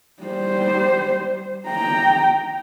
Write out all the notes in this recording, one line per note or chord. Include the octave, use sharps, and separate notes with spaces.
G3 C5
G5 A#5